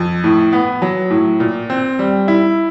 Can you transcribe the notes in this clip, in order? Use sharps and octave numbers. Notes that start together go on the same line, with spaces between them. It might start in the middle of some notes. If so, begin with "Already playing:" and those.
Already playing: F2
A2
B3
F#3
A2
A#2
C4
G3
E4